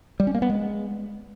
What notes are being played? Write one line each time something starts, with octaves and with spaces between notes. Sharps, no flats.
G3
C#4
A#3
B3
G#3